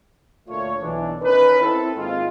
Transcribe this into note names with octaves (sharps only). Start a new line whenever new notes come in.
D2 A#2 A3 F4 C#5
B1 E3 D4
D#3 C#4 D#4 A#4 B4
C4 E4 A4
G#2 D#3 G#3 A#3 C4 F4